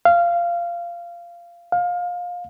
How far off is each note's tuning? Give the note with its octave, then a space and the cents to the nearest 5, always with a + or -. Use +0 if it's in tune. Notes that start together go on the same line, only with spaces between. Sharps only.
F5 -15
F5 +25